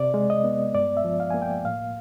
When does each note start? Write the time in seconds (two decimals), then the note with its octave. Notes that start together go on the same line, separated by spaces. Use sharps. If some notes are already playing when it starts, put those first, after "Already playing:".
Already playing: C3 D5
0.14 G#3
0.30 D#5
0.44 B3
0.74 G2 D5
0.97 E5
1.04 F3
1.20 F5
1.30 A#3 G#5
1.42 G5
1.64 A2 F5